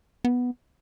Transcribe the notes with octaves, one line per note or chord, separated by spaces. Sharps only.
B3